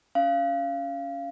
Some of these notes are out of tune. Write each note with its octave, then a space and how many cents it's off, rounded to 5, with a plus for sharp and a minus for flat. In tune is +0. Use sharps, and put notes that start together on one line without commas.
C#4 +20 F5 -20